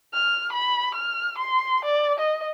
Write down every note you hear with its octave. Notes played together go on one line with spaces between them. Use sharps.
F6
B5
F6
C6
D5
D#5